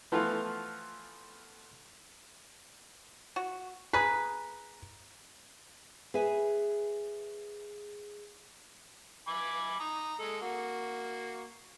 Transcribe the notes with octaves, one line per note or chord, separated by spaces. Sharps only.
E3 F3 A3 B3 F4
F#4
G#4 B4 A#5
G#4 B4 E5 G#5
G#5 B5 D6
A#5 D#6
G#3 A4
A#3 F#4